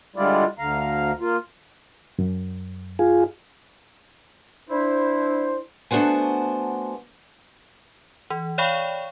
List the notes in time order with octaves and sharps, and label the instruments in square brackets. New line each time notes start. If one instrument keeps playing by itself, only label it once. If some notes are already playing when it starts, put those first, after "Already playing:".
[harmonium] D3 G3 G#3 E4 F4 D5
D2 D3 F5 A#5
A#3 F4
[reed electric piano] F#2
[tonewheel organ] F4 G#4
[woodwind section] D4 E4 C5
[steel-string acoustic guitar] A3 B3 D4 F#4 C5 G#5
[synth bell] E3
C#5 D5 F5 G5 B5 C#6